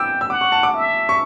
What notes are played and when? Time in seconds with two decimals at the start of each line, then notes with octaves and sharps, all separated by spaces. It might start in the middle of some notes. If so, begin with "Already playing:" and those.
Already playing: G5 D6 E6
0.21 E6
0.30 F#5 D6
0.41 C#6
0.52 A5
0.63 D6
0.74 E5
1.09 C#6